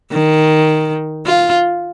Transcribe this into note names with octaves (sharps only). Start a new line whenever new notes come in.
D#3
F4